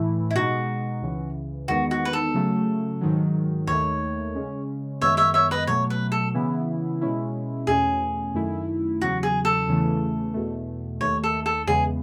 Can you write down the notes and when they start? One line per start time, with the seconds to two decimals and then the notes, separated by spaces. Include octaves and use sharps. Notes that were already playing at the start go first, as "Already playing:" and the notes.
Already playing: A2 E3 A3 E4
0.31 E4
0.35 B2 G#3 D#4 F#4
1.02 C#2 C#3 E3
1.68 E2 D#3 G#3 B3 D#4 F#4
1.91 F#4
2.05 B4
2.13 A4
2.34 C#3 F#3 A3
3.01 G#2 D#3 F#3
3.67 D#2 D#3 A3 C#5
4.35 C#3 G#3 C#4
5.01 F#2 D#3 G#3 B3 C#5 E5
5.17 C#5 E5
5.34 C#5 E5
5.51 B4 D#5
5.67 B2 F#3 A3 C#5
5.90 B4
6.12 A4
6.34 C#3 E3 B3 E4
7.01 B2 G#3 C#4 E4
7.67 E2 B2 A3 C#4 G#4
8.34 F#2 D#3 A3 E4
9.01 E2 C#3 F#3 F#4
9.23 G#4
9.45 A4
9.68 E2 C#3 E3 A3
10.34 E2 B2 A3
11.01 D#2 D#3 A3 C#5
11.24 A4
11.46 A4
11.67 E2 C#3 E3 G#3 B3 G#4